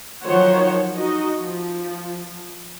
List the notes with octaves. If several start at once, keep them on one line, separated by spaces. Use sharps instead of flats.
D#3 F3 F#3 C5 C#5 F#5
D#4 F#4 D#5
F3